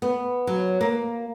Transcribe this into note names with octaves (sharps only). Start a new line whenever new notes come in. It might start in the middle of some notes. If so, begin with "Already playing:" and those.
B3
F#3
A#3